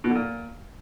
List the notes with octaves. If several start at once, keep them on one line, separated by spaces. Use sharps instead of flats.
B2
D3
A#2